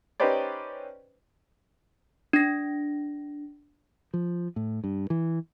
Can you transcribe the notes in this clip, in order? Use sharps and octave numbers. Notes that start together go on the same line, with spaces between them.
C#4 D#4 G4 B4 C5 D5
D4 A#6
F3
A2
G2
E3